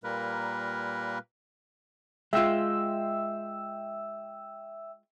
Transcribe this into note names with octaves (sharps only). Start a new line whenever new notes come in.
A#2 G3 A#3 A#4 B4
G#3 F4 E5 G5 E6